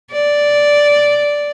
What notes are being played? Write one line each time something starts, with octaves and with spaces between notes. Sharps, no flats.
D5